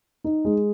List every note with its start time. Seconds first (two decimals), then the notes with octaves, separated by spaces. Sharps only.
0.24 D#4
0.45 G#3